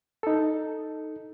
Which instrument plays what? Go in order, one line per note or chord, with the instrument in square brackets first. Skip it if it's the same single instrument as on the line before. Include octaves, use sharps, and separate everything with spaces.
[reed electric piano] D#4 A4